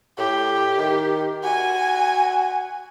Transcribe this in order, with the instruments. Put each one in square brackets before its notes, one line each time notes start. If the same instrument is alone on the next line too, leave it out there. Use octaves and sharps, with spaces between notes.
[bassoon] A2 [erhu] G4
[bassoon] D#3
[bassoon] F#4 [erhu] G#5